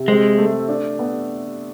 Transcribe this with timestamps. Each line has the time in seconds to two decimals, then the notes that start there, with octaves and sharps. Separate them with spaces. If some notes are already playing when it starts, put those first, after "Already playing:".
Already playing: C3
0.08 G#3 C4
0.38 A3
0.69 D4
0.99 B3